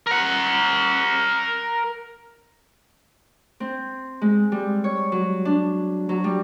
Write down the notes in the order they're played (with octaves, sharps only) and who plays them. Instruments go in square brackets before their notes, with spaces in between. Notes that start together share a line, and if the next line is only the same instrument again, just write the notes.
[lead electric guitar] A#4 F#5
[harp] C4
G#3
G3
C#5
F#3
D4
F#3
G3